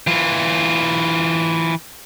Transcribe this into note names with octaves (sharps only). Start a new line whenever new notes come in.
E3 F4